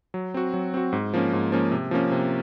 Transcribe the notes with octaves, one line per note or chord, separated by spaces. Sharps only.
F#3
C4 F#4
F#3
C4 F#4
G#2
F3 A#3 C#4
G#2
F3 A#3 C#4
C3
F3 A#3 C#4
C3